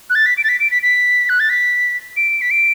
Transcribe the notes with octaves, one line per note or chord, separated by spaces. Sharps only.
F#6
A6
B6
D7
A6
B6
D7
B6
B6
F#6
A6
B6
D7
B6
D7